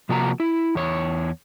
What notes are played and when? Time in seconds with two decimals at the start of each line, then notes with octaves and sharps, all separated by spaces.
0.09 C3 F3 A#3 F#4 C#5 A#5
0.40 E4
0.75 E2 C#5